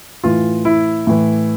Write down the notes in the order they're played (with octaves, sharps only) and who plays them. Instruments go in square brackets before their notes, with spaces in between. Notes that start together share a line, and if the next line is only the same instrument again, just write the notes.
[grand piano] A2 E3 F4
E4
A2 E3